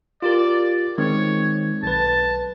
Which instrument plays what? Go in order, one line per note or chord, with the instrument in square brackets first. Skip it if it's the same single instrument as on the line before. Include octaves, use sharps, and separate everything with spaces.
[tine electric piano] F4 G4 A#4 [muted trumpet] D5
[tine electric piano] D#3 G#3 C4 [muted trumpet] C#5
[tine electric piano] B1 B4 [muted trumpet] A5